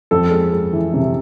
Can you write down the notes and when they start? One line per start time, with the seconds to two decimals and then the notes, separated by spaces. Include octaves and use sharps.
0.11 F2 A4
0.31 G#3
0.53 G#3
0.73 E3
0.94 C3